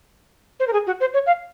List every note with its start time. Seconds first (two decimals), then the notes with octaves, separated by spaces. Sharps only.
0.60 C5
0.68 A#4
0.73 G#4
0.87 F#4
1.00 C5
1.14 C#5
1.26 F5